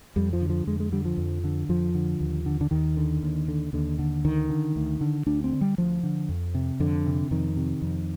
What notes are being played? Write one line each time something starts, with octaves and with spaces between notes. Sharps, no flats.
F2 G3
F3
D3
F3
F2 G#3
G#3
D3 G3
F3
F2
D3
F2 F3
D3
D#2
D3
D3
D#2 D#3
D3
D#2
D3
D#2 D3
D3
D2 D#3
D3
D2
D3
D2 D4
C4
D3
G3
D2 F3
D3
F2
C3
F2 D3
C3
F2 D#3
C3
F2